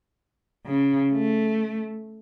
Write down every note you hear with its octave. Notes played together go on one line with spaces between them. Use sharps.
C#3
A3